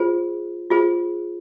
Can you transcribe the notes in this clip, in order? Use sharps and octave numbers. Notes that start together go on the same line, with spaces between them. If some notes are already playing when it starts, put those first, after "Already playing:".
Already playing: F4 G#4 C5
F4 G#4 C5